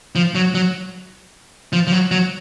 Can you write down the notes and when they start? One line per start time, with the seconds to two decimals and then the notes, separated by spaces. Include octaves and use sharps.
0.15 F3
0.35 F#3
0.54 F#3
1.73 F3
1.87 F3
1.92 F#3
2.11 F#3